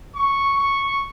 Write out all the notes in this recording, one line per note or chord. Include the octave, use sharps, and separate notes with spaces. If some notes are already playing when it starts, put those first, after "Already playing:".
C#6
C#6